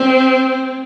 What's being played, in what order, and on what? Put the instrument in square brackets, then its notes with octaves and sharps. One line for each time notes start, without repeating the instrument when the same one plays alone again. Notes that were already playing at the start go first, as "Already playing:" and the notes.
Already playing: [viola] C4